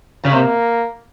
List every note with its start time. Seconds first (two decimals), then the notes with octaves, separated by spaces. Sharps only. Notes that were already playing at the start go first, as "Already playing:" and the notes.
0.25 C#3
0.33 C3 A#3